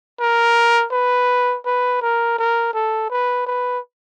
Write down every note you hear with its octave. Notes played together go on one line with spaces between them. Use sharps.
A#4
B4
B4
A#4
A#4
A4
B4
B4